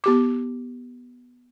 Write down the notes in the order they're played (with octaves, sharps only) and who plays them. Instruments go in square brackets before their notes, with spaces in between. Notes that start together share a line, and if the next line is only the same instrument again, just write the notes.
[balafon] B3 G4 D6